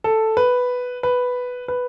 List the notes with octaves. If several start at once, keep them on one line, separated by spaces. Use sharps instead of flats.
A4
B4
B4
B4